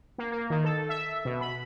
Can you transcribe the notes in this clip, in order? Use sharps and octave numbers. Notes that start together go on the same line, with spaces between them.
A#3
A#3
D#3
A4
E5
B2
B5